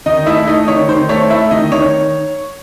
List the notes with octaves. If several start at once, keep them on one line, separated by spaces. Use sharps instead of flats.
D#3 D#4 D#5
A3 E4 E5
A3 D#4 D#5
D#3 C#5
D#3 C5
A3 C#5
A3 E4 E5
D#3 D#4 D#5
D#3 C#5